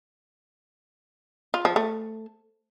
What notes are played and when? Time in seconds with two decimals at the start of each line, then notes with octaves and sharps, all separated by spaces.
1.54 F4
1.65 F3
1.76 A3